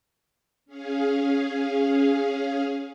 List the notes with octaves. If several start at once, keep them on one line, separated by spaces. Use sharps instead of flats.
C#4 G#4 F5